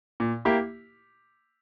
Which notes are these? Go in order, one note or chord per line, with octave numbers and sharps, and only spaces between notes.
A#2
A#3 E4 G4